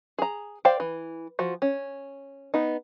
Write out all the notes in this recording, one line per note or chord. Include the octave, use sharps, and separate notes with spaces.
G#4 A#5
C5 D5 F5 G5
E3
F3 F#4
C#4
B3 D#4